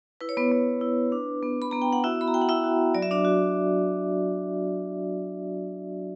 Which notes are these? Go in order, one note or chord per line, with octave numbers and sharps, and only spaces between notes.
E4 B4
C#5
B3 B4
B3
E4
D4
B3
B5
B3 A#5
G5
F#5
E4 F#4 E5
B5
A#5
F#4 G5
F#5
E4 E5
F#4
F#3 D5
E5
D4 D5
F#4